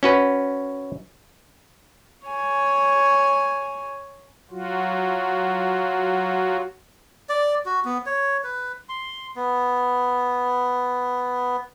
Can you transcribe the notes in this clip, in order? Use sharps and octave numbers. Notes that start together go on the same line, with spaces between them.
C#4 F#4 B4
C#5 G#5
F#3 F4 F#4
D5
F#4
B3
C#5
B4
C6
B3